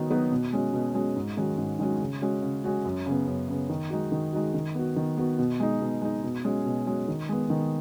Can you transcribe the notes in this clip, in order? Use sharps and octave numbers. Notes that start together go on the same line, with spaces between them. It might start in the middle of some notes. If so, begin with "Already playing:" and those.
Already playing: D#3 F#3 B3 D#4 F#4
F#3 B3 D#4 F#4
B2
G#3 C#4 F#4
B2
G#3 C#4 F#4
G#2
D#3 G#3 C#4 F#4
G#2
D#3 G#3 C#4 F#4
C#3
G#3 C#4 F#4
C#3
G#3 C#4 F#4
F#2
C#3 B3
F#2
C#3 B3
D#3
G#3 D#4 F#4
D#3
G#3 D#4 F#4
D#3
B3 F#4
D#3
B3 F#4
B2
G#3 D#4
B2
G#3 D#4
B2
G#3 C#4 F#4
B2
G#3 C#4 F#4
D#3
G#3 B3
D#3